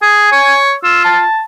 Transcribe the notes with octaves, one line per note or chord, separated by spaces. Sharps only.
G#4 G#5
C#5
F4 E6
A5